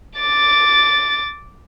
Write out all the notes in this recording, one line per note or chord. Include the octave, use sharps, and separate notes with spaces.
D6 A6